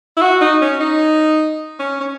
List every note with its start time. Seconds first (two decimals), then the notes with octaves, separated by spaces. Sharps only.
0.17 E4
0.22 F#4
0.41 D#4
0.61 C#4
0.80 D#4
1.79 C#4
2.00 C#4